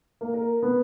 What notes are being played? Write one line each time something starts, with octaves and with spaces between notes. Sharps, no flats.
A#3
A#4
B3